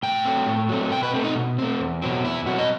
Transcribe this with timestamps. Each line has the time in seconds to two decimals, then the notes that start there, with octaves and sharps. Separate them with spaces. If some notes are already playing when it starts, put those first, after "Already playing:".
0.03 A2 G5
0.25 F#3 A3 C4
0.47 A2
0.69 F#3 A3 C4
0.91 B2 G5
1.03 B4
1.14 A3 C4
1.24 D#4
1.35 B2
1.58 A3 C4
1.80 E2
2.02 B2 F#3 C4
2.24 E2 E4
2.46 B2 F#3 C4 F#4
2.58 D#5